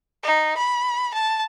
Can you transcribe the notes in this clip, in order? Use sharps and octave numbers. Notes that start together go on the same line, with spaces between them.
D#4
B5
A5